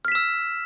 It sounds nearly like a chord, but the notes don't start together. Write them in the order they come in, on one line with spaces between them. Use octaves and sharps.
F6 B6 E7 E6